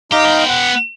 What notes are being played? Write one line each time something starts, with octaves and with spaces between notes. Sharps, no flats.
D#4 G4 F5 A#5
B3 G5
F#5